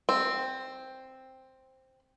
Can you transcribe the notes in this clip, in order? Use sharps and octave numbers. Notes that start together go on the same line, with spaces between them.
C4